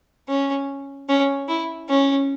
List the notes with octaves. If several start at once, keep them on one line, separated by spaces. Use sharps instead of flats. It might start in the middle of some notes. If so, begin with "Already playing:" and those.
C#4
C#4
E4
C#4